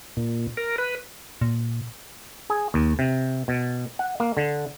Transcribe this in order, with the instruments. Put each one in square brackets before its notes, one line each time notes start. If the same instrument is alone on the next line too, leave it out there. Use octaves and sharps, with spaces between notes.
[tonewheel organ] A#2
A#4
B4
[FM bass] A#2
[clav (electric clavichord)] G#4
D#2
C3
B2
F#5
A#3
D3